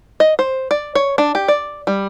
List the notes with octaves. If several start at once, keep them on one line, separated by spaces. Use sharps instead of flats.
D#5
C5
D5
C#5
D4
G4
D5
G3